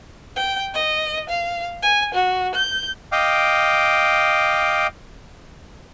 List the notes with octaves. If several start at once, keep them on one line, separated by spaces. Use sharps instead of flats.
G5
D#5
F5
G#5
F#4
G6
D#5 F5 G5 D6